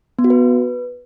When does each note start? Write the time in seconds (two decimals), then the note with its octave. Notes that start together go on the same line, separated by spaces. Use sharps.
0.19 B3
0.24 F#4
0.30 B4